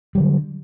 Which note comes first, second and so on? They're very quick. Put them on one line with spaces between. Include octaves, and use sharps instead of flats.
G3 F#3 D3